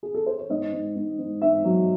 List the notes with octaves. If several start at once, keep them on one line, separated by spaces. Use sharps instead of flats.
G#4
A4
C5
C#5
G#2 D#5
G#2
G#2
G#2
G#2 E5
F#3